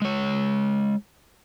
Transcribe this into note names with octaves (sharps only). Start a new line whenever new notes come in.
G#3 C#5